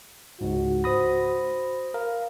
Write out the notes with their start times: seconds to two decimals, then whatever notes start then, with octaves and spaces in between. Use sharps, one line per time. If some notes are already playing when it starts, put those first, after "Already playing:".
0.41 C#2 G#2 F#4
0.84 C5 B5 D#6 A#6
1.94 A#4 F5